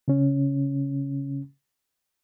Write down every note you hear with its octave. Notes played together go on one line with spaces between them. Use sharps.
C#3 C#4